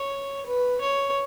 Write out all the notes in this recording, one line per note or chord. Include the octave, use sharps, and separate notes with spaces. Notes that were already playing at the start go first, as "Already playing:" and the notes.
Already playing: C#5
B4
C#5